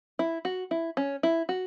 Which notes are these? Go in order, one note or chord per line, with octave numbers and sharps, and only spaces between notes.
E4
F#4
E4
C#4
E4
F#4